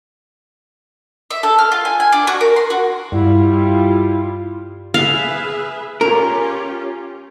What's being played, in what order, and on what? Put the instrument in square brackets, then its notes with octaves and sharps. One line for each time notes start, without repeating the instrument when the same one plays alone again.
[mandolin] E5
A4
F6
F4
G#5
G#5
D4
F#4
A#4
C6
F#4
[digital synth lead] G2 [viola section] G3 F4 [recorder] E4
[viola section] G#4 B4 E5 [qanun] F5
[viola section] C#4 F4 G4 [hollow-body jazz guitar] A#4